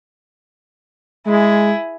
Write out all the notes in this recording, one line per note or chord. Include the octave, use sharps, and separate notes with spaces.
G#3 E4 G#4